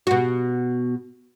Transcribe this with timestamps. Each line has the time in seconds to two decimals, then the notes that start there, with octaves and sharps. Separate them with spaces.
0.07 B2 F#4